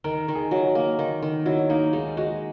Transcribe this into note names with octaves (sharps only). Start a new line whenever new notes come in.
D#3 A#4
D#3
G#4
F#3
F#4
A#3
D#3 D#4
D#3
F#3 E4
A#3 D#4
G#3 D#4
G#3 F#4